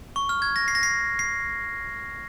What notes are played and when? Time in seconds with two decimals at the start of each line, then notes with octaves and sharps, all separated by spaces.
0.16 C#6
0.29 F6
0.42 G#6
0.56 A#6
0.68 C7
0.75 A#6
0.83 C7
1.19 C7